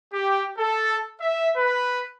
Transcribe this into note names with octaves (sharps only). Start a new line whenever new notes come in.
G4
A4
E5
B4